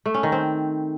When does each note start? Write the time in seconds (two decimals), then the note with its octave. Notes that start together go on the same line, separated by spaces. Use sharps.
0.06 A3
0.14 C#4
0.23 D#3
0.32 C4